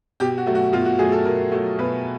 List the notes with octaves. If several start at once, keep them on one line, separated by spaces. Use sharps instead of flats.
B2 G4
F#4
F#3 A3
F#4
B2 F4
F#4
F#3 A3 G#4
A4
B2 A#4
F#3 A3
B2 B4